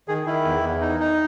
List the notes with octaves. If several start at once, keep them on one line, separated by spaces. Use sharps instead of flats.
D#3 G#4
D#3 E4
E2
E2
D#4
D#4